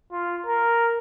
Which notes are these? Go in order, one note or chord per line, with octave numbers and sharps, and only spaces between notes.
F4
A#4